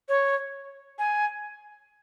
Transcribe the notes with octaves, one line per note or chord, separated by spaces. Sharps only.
C#5
G#5